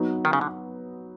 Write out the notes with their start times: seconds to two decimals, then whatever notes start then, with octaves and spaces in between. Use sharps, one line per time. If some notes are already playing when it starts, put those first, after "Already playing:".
Already playing: F#3 B3 D#4
0.25 D#3
0.33 C#3
0.41 D3